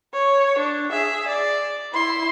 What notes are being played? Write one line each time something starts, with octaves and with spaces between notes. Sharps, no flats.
C#5
D4
G#4 E5
D5
E4 C6